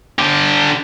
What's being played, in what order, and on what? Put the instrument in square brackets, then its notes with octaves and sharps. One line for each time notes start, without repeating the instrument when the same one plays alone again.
[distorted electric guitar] D3 G4